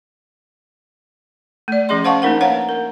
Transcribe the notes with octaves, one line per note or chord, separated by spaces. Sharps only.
A3 D5
F3 C#4 G#4 D#5 C6
C5 F5 F#5 A5 C#6
A#3 D4 D#4 A#4 F#5
B4 C#5 F5 F#5 A#5
A#4